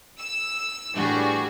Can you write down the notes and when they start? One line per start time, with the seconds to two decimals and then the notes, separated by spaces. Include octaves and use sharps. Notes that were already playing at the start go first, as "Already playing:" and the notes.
0.18 E6
0.94 A2 E3 G3 D4 F#4 G#4